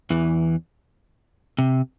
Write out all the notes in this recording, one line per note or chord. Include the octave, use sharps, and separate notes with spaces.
E2 E3
C3